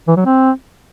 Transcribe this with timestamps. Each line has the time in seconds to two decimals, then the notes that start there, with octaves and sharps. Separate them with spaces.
0.08 E3
0.17 F#3
0.26 C4